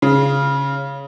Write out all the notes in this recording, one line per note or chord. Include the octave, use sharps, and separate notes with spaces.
C#3